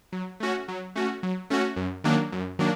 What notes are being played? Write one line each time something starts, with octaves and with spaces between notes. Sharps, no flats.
F#3
A3 C#4 F#4
F#3
A3 C#4 F#4
F#3
A3 C#4 F#4
F#2
D#3 F#3 A#3 D4
F#2
D#3 F#3 A#3 D4